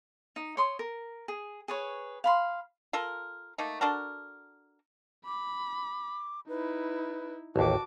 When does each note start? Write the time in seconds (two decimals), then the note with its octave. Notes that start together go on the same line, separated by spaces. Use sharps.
0.36 D#4
0.57 C#5 C6 D#6
0.79 A#4
1.28 G#4
1.68 G#4 B4 C#5
2.24 F5 B5 C6
2.93 F4 A4 A#4
3.58 A3 A#3 D#4
3.81 D4 F#4 A4 A#4
5.25 B5 D6
6.48 D#4 E4 B4
7.56 A1 D#2 F#4 A5 D6